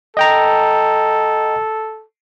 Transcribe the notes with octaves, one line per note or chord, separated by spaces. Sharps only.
A4 D#5 G5 A#5